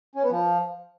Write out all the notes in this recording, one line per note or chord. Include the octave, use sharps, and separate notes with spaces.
C#4
B3
F3